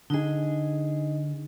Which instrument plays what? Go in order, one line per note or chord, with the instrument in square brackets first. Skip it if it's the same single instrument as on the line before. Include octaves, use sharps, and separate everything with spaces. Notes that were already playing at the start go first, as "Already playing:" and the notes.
[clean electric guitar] D3 G#4 [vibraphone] D#4 D#5